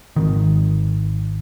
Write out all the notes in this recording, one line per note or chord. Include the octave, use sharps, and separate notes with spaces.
G#1 D#3